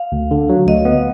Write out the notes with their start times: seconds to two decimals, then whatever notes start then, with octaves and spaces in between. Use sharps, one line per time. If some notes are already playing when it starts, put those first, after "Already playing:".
Already playing: F5
0.12 D2
0.31 D3
0.49 F#3
0.67 D2 D#5
0.85 B3